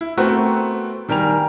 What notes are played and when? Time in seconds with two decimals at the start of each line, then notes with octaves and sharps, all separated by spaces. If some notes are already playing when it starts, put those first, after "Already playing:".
0.01 E4
0.17 A3 B3 C4 F#4 A#4 B4
1.09 D#3 G3 A#4 G#5 F7